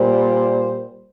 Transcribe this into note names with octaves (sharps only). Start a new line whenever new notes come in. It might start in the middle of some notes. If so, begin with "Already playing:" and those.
Already playing: A#2 G3 C5